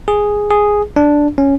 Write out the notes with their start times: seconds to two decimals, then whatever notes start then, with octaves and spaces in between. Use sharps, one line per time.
0.08 G#4
0.50 G#4
0.96 D4
1.38 C#4